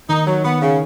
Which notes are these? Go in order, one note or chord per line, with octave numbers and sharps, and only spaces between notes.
D#3 D#4
F#3
D#3 B3
C#3